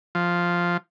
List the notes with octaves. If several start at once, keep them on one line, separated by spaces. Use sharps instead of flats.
F3